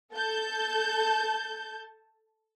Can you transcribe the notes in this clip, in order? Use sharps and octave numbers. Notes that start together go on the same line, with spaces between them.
A4 A5 G6